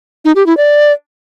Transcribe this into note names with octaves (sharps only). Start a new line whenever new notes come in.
D#4
G4
E4
D5